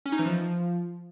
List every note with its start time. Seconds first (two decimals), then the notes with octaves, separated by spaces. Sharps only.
0.06 C#4
0.12 D#4
0.19 E3
0.26 F3